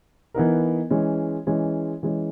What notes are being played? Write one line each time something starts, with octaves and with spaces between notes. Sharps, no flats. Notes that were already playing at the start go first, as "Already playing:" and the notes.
E3 B3 D#4 A#4
E3 G#3 C#4
E3 G#3 C#4
E3 G#3 C#4